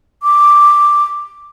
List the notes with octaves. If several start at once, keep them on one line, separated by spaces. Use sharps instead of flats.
D6